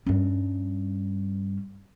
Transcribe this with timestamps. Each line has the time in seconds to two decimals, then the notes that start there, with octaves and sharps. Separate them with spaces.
0.06 G2 C#4